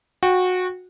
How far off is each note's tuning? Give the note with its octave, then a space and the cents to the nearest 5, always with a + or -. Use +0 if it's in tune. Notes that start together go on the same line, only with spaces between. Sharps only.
F#4 -20 G5 +0